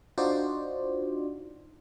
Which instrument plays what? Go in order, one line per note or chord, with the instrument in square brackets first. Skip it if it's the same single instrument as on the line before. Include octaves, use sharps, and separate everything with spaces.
[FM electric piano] D4 D#4 F4 F#4 C5 D5